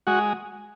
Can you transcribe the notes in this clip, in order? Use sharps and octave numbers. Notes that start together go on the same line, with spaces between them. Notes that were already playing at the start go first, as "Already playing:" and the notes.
G#3 F#4